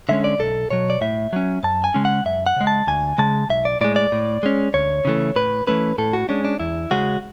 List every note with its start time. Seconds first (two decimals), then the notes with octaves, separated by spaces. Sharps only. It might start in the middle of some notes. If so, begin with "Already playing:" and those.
0.09 D3 G#3 C#4 E5
0.24 D5
0.39 B1 A4
0.70 B2 F#3 C#5
0.90 D5
1.01 A2 E5
1.33 F#3 C#4
1.63 F#2 A5
1.84 G#5
1.94 C#3 G#3 C#4
2.05 F#5
2.26 F#2 E5
2.46 F#5
2.56 C#3 G#3
2.67 A5
2.87 D2 G#5
3.18 C#3 G#3 A5
3.50 B1 E5
3.65 D5
3.81 A2 G#3 D5
3.96 D5
4.12 A2
4.43 G#3 C#4
4.74 D2 C#5
5.05 C#3 E3 A3
5.36 A2 B4
5.67 E3 A3 C#4 B4
5.98 A2 A4
6.13 F#4
6.29 G#3 C#4 D4
6.45 D4
6.59 E2 E4
6.91 C#3 G#3 C#4 F#4